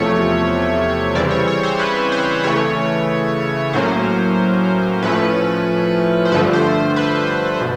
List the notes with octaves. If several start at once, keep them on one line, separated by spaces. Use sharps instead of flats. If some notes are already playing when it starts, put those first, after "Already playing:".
Already playing: E2 C3 F3 A3 C#5
C#3 E3 G3 C4 D5
C#5
C#5
C5
B4
C5
C#3 E3 A3 C#5
A2 F#3 A#3 C#4 C5
A2 F3 A3 C#4 B4
C5
G2 D3 F3 A3 B4
C5
B4
B2